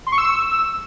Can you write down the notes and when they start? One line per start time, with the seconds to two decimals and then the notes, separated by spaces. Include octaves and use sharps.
0.07 C6
0.12 C#6
0.18 E6